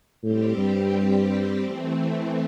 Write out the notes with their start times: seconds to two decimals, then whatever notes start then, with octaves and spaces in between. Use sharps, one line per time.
0.23 A2 G3 C4 G4
0.57 G2
1.61 E3 A3 C4